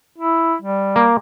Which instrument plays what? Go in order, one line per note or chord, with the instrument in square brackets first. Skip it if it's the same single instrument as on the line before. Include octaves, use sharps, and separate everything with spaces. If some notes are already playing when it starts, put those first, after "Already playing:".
[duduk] E4
G3
[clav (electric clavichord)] A#3